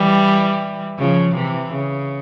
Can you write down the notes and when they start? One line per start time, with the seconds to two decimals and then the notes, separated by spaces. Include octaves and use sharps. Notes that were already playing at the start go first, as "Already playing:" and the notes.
Already playing: E3 G3
0.98 C#3 F3
1.35 C3 E3
1.72 C#3